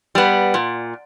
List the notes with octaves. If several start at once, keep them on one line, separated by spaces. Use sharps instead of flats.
G3 B3
A#2